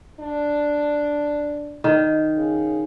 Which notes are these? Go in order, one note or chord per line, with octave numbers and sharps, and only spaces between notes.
D4
D#3
C#3